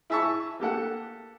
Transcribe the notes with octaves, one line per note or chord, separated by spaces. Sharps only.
E4 G#4 E5 A5 C#6
A#3 G4 A4 F#5